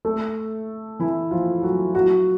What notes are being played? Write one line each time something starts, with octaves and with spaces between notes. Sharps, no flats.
A3 A4
E3 E4
F3 F4
F#3 F#4
F#3 F#4